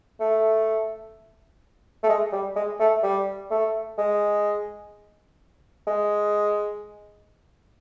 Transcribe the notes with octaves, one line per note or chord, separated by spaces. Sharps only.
A3
A3
G#3
G3
G#3
A3
G3
A3
G#3
G#3